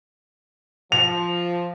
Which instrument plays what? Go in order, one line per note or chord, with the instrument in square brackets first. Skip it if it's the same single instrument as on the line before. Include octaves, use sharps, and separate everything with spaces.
[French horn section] F3 [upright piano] F7